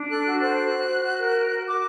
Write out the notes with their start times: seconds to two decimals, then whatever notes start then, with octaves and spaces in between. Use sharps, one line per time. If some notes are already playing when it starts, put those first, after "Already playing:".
Already playing: D4
0.09 A4 F#6
0.25 F#4
0.40 C5 F#6
0.57 F#4
0.73 F#4
0.88 F#4
1.03 F#4
1.19 A#4
1.35 F#4
1.51 F#4
1.66 F#4 D6